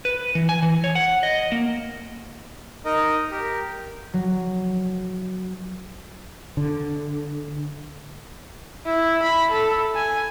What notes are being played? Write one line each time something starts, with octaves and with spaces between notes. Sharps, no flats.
B4
E3
G#5
E3
C#5
F#5
D#5
A#3
D#4 A#4 D#5
G4 A#4
F#3
D3
E4
B5
A4
G#5